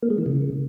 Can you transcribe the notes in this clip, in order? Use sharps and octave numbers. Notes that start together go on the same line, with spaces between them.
A#3
G#3
E3
C#3